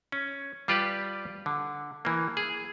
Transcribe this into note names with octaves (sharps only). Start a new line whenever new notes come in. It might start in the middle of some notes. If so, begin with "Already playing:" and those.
C#4
G3 F4 G4 B4 D5
D3
E3 A#3
G#4